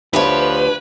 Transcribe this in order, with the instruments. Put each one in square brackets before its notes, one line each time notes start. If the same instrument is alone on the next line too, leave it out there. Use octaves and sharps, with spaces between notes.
[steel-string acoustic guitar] D2 G4 C#5 [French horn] F3 [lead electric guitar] B4